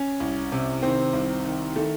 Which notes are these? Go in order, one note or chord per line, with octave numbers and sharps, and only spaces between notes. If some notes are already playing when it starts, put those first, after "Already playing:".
Already playing: C#4
C2
C3
D#3 C4
C2
D#3
D#3 A3